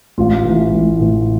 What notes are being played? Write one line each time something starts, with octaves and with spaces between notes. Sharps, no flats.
A1 F4
A2 E3
A1
A2 E3